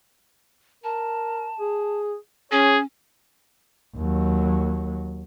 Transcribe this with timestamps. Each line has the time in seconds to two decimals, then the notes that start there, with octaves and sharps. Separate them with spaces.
0.84 A#4 A5
1.60 G#4
2.52 C#4 G#4 C#5
3.96 D#2 F#3